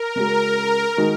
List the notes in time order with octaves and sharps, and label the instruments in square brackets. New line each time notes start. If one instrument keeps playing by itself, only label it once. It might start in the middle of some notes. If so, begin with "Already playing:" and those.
Already playing: [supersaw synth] A#4
[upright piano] C#3 G#3 C#4 F#4
D#3 G#3 D#4 F#4